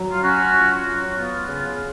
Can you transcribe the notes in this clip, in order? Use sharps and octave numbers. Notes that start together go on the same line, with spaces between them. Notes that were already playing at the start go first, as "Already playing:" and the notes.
Already playing: F#3
F4
C#4 F#4
F4
F#4
F#3
B3 F4
C#3 F4